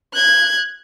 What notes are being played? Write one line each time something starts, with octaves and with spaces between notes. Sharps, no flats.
F#6 G#6